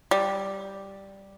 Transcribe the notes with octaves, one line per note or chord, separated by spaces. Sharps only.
G3